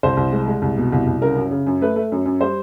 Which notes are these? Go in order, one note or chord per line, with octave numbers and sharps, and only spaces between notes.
C2 C5
C2
G#3
G#3
C2
B2
C2
C2
C#3 A#4
F#2
C#3
F#2
A3 B4
A3
F#2
F#2
G3 C5